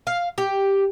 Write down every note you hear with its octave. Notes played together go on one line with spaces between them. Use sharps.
F5
G4